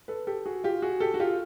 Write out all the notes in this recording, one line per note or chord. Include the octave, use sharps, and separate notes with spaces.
A4 B4
G4 A4
F#4 G#4
F4 G4
F#4 G#4
G4 A4
F#4
F4 G4